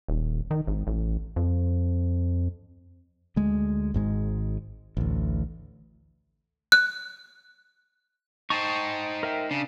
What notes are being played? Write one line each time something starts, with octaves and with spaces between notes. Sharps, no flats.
D#1
D#3
G#1
A1
F2
D2 G#3
G#1 G#2 G#3
A1 D2
F#6
D#4 C5 G5 A5 C#6
A#4 E5 G5
C#3 D4